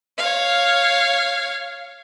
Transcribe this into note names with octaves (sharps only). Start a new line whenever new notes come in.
C#5 F5